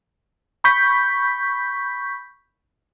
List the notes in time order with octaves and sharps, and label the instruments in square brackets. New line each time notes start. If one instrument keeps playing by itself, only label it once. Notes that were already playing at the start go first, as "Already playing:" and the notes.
[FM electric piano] B5 C#6 G6 B6